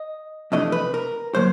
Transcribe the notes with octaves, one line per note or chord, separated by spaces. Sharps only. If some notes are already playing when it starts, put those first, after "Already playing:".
Already playing: D#5
F2 C3 E3 A3 D4 D#5
B4
A#4
D3 F#3 A#3 C5